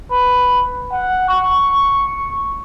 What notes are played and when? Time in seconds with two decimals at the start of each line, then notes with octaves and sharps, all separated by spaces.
0.11 B4
0.92 F#5
1.30 C#6